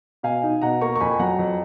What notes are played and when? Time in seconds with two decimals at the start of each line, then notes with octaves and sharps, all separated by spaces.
0.23 B2 F5 G#5
0.43 D#4
0.62 B2 F#5 A#5
0.81 A#3 A#5 C#6
0.96 C#6
1.00 F2 G#5 B5
1.11 G#5
1.19 F#3 F#5 A#5
1.38 F2